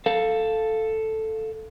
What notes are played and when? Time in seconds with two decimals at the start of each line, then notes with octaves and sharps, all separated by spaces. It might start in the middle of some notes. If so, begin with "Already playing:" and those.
0.06 A4 F5